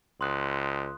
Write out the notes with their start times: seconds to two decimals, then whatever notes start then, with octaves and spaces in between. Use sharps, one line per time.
0.21 C#2 C6 D#6 F#6